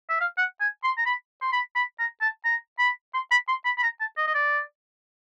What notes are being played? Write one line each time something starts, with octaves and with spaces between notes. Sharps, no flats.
E5
F5
F#5
G#5
C6
A#5
B5
C6
B5
B5
A#5
A5
A#5
B5
C6
B5
C6
B5
B5
A#5
A5
D#5
D#5
D5